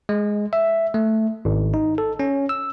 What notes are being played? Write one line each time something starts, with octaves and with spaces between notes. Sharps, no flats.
G#3
E5
A3
G#1
D#4
A4
C#4
E6